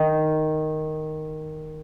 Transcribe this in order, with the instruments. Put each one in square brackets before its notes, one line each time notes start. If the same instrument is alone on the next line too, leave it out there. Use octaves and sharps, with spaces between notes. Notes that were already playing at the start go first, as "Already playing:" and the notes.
Already playing: [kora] D#3